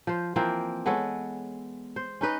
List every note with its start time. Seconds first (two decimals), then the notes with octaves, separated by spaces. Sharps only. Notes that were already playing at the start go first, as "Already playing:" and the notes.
0.07 F3 C5
0.36 E3 F3 A#3 C4
0.86 G#3 B3 A4 C#5
1.96 C5
2.21 C#4 D#4 B4 D#5